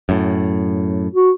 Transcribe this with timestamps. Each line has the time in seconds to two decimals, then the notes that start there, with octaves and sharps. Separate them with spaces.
0.09 F#2 A2
1.14 F#4